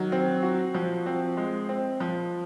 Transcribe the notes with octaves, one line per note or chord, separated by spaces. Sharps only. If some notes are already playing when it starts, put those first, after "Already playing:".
Already playing: D#3 F#3
C4
F#4
F3
C4
G#3
C4
F3